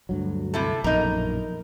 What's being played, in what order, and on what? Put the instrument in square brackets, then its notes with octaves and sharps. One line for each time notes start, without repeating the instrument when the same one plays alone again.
[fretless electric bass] D2 G2 F#3
[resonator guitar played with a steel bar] C3 E4 A4
[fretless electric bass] A#1 F#2 B2 [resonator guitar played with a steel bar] D#4 A#4